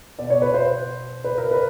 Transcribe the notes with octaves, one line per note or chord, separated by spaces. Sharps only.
B2 D5
C#5
B4
C5
B4
A#4
B4